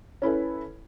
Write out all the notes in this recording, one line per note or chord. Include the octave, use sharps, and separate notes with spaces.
C#4 E4 A4 B4